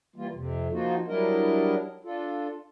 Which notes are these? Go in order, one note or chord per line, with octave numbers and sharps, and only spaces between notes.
E3 G3 A#3 F4
F2 C3
F3 A#3 D#4 F4 F#4
F#3 G3 D4 E4 A#4 D#5
D4 F4 A4